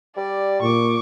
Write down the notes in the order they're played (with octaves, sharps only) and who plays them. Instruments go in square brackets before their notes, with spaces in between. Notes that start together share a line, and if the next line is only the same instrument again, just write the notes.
[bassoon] G3 [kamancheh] D5
[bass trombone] A#2 [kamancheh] C#6 D6